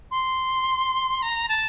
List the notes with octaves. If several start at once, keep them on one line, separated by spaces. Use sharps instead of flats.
C6
A#5
A5